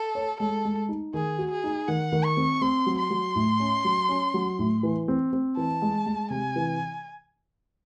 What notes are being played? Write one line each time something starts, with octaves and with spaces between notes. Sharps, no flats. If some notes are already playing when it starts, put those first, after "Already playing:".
Already playing: A4
C#5
G#3 A4
G#3
D#4
D#3 G#4
F#4
G#4
D#4
D#3 F#5
D#3
C#6
C4
C4 C6
F#3
C6
F#3
A2
C#4
F#3
C#4
F#3
A2
E3
C4
C4
E3 A5
G#3
G#3
C3 G#5
E3